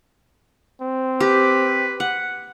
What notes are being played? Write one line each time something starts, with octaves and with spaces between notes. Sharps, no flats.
C4
G4 B4
F#5